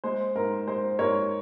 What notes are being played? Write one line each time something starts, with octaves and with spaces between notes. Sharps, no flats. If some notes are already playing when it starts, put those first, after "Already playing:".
G#3 C5
G#2 A#4
G#3 C5
G#2 A#4 C#5